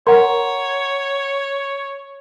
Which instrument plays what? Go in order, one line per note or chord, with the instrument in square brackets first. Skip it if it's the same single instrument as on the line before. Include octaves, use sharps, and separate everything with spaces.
[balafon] A#4 [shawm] C#5 [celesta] F#5 A#5 C6